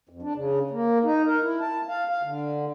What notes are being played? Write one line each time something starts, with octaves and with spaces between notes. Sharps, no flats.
F2
D4
C#3
A#3
D#4
A#4
E4
A5
F5
F5
D3